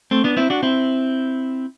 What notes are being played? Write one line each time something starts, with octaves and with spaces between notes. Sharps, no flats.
A3 C4
B3 D4
C4 E4
D4 F#4
C4 E4